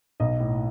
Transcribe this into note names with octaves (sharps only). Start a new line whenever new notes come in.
B1 D#5
A2